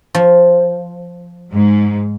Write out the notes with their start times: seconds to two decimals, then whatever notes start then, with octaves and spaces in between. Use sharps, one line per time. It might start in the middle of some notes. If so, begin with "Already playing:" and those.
0.15 F3
1.51 G#2